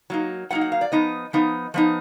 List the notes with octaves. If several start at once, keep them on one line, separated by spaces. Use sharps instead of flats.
F#3 A#3 D#4
F#3 A#3 D#4 F#5
F#5
F5
D5
F3 B3 D#4 D#5
F3 B3 D#4
F3 B3 D#4